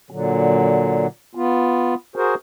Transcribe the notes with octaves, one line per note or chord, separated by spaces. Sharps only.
A#2 D3 F#3
B3 F4
F#4 G#4 A#4 C5